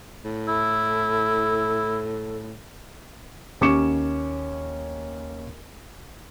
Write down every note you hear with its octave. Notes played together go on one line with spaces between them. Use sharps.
A2
E4 A4
D#2 C#4 C#6 D6 C#7 E7